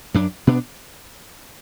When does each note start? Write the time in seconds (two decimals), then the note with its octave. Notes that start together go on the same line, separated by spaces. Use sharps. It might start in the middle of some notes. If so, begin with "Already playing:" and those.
0.14 F#2 F#3 D4
0.47 B2 B3 D4